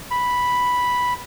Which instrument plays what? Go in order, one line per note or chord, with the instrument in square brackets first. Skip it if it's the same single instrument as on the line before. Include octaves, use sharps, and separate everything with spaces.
[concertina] B5